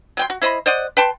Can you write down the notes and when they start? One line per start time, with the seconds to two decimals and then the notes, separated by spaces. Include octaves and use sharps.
0.17 F#3 G5 C6
0.30 F#4
0.42 E4 C5 D#5 B5
0.66 C5 D5 D#5 F#5
0.97 B4 G5 A5 C6